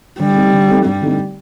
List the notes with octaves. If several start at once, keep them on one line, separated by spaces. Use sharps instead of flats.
D3 G3
A3 C4 D#4 G4
D3
A3 C4 D#4 G4
G2 G3
D3 A3 C4 D#4